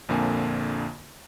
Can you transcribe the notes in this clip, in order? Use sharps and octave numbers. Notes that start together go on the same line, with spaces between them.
A#1 F2 D3 A#3 G#5